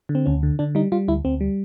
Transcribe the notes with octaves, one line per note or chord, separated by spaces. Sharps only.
D3
C4
D2 C#4
D3
D3 D4
G3 D#4
G3 F4
D2 E4
D2 C4
G3